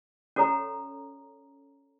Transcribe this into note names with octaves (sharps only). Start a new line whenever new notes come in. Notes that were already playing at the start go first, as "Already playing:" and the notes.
C#4 F#4 A4 C#5 A#5